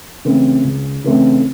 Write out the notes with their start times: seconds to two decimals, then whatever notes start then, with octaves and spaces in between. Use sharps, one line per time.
0.25 C#3 E3 A3 C4
0.64 C#2
1.04 C#3 E3 A3 C4